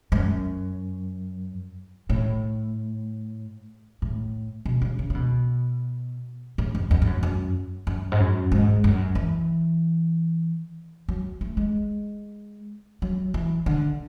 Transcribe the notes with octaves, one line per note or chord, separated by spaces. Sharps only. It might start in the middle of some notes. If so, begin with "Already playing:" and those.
G#2
F#2
A2
A2
B2
C#3
C#3
C#3
B2
A2
F#2
E2
G#2
F#2
F#2
F#2
G#2
F#2
G#2
F#2
E3
F#3
A3
G#3
F#3
E3
D3